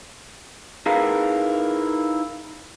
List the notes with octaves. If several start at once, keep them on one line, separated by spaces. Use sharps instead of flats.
D#4 E4 G#4 A#4 B4 F5